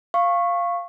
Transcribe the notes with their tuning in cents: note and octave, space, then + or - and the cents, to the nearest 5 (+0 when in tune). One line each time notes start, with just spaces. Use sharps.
F5 -5 C#6 -15